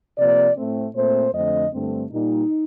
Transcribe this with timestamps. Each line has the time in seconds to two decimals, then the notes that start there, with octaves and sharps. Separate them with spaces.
0.18 C3 F3 A#3 D5
0.56 A2 A3 C4
0.95 A#2 A3 C4 C5
1.34 F2 D3 A3 C4 D#5
1.73 G2 D3 A3 C4
2.12 A#2 G3 A#3 D#4